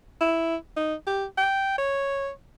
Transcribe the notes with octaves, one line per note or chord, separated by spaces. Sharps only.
E4
D#4
G4
G5
C#5